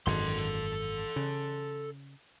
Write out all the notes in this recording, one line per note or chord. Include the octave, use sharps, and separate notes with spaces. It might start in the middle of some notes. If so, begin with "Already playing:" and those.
G#1 F#2 A4 C6
C#3